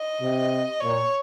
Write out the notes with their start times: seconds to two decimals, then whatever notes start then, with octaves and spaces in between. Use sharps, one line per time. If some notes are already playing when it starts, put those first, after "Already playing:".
Already playing: D#5
0.21 C3
0.80 A#2 C#5